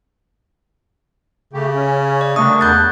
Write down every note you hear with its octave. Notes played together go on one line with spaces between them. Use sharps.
C#3 A3 G4
C#4
D5
C3 G3 A3 A#3 D4 C#6 D#6
E2 F#5 G6 A6